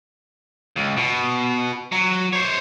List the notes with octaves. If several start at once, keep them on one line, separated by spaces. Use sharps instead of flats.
C#2
B2
F#3
C5 C#5